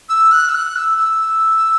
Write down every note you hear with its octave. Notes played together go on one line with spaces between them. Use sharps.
E6
F#6
E6
F#6
E6
E6